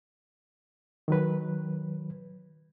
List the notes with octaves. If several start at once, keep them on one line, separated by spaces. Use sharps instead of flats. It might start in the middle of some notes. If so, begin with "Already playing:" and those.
D#3 F#3 B4